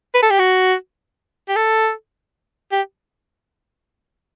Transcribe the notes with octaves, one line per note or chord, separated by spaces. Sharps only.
B4
A4
G4
F#4
G4
A4
G4